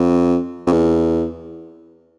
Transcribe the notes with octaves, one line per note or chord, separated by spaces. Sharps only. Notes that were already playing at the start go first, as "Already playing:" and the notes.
Already playing: F2
F2
E2